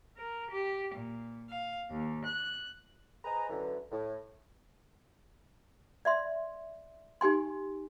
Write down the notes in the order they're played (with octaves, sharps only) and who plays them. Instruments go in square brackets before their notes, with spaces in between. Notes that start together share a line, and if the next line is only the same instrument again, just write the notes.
[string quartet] A#4
G4
A#2
F5
D#2
F#6
[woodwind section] G#4 B4 C5 D#5 G#5 A#5
F#2 D3 E3
A2
[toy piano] D5 E5 C6
D#4 G4 G#5 C6